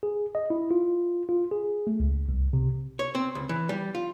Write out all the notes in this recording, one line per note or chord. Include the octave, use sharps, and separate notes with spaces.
G#4
D#5
E4
F4
F4
G#4
A3
C#2
C2
C3
C#5
C4
C#2
E3
G3
F4